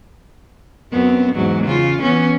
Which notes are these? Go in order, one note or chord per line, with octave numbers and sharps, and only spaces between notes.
F#2 B3 C4
E2 G#2 F#3
C#3 F4
E3 B3 C#4